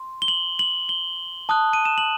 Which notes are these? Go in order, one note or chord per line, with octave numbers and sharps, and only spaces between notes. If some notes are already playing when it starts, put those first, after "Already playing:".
Already playing: C6
G7
F#7
F#7
G7
A5 D#6 F#6
D#7
E7
F#7